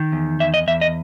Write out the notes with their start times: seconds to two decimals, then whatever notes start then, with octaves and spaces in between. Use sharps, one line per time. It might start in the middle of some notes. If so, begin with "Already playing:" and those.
Already playing: D#3
0.12 E2
0.40 E2 E5
0.54 D#5
0.67 E2 E5
0.81 D#5